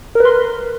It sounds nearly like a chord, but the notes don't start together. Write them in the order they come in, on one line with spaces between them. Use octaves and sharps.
A#4 B4 C6